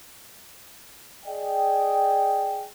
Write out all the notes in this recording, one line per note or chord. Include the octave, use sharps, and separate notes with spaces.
G#4 D5 D#5 G5